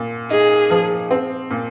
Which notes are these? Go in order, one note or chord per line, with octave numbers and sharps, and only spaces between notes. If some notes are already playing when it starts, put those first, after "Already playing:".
Already playing: A#2
D#4 G#4
F3
C4
A#2